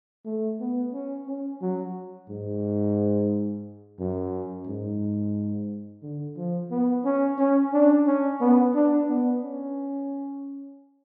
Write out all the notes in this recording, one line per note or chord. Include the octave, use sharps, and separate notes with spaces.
A3
B3
C#4
C#4
F#3
G#2
F#2
G#2
D3
F3
B3
C#4
C#4
D4
C#4
B3
D4
B3
C#4